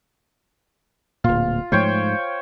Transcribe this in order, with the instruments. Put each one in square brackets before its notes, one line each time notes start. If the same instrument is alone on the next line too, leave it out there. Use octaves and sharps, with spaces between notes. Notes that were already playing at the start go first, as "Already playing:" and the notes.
[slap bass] D1 A#2 [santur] F4
[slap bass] G#2 F3 A3 [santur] C5 C#5 G5